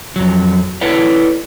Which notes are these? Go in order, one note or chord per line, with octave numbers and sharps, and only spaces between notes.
F2 F#3
E4 A4 B4 C#5 D5